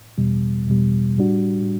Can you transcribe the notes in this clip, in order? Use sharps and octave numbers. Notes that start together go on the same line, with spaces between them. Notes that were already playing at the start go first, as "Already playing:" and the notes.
E2 B2 G3
E2 B2 G3
A2 G3 D4 F#4